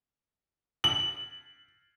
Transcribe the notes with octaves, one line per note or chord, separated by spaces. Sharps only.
F#7